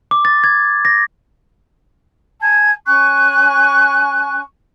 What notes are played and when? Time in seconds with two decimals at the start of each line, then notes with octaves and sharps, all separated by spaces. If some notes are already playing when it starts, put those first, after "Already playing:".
0.11 D6
0.25 A6
0.44 G#6
0.85 A#6
2.41 G#5 A5 G#6
2.86 C#4 G#5 C#6 F#6